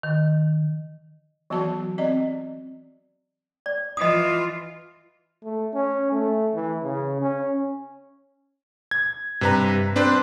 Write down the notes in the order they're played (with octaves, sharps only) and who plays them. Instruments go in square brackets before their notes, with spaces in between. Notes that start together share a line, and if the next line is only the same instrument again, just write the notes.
[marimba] D#3
[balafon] E3 F#3 B3 F#4 A5
C4 D5 D#5
[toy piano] D5
[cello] E3 F4 [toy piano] D#5 D#6
[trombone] A3
C#4
A3
E3
C#3
C#4
[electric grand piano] G#6
[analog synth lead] G2 [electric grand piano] C3 B4 A#5
[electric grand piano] C4 D4 B4 [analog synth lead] C5